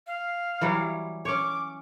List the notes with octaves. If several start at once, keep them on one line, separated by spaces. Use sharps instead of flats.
F5
E3 F#3 G3
C#4 C#5 D6